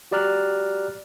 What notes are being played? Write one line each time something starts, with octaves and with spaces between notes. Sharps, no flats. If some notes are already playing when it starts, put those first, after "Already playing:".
F#4 G4 D5 A#5 F6 F#6